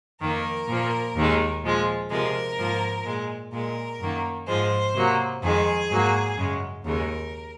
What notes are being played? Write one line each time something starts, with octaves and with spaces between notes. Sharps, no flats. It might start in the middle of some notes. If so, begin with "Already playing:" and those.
F2 D#3 A#3 A#4
A#2 F3 A#3
D#2 D#3 G#3
A#2 F3 G#3
C3 F3 G#3 A#4
G#2 F3 A#3
A#2 G#3
A#2 G#3 A#4
F#2 D#3 A#3
G#2 F3 G#3 C5
C3 F#3 A#3
F2 D#3 G#3 G#4
G#2 F#3 A#3
F#2 C#3 G#3
D#2 C#3 G#3 A#4